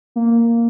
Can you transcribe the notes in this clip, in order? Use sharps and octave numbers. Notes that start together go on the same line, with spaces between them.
A#3